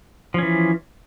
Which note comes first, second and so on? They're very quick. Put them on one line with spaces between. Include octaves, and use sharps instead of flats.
F3 C#4 E3